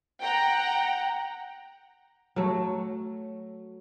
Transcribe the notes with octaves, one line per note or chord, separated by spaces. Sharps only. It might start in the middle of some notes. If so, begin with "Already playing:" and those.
F#5 G5 A#5
F#3 A3